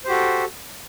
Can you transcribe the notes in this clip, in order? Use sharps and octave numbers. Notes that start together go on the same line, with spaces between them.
F#4 G4 A4 C5